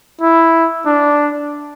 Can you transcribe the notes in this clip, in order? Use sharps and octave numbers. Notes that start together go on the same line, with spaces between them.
E4
D4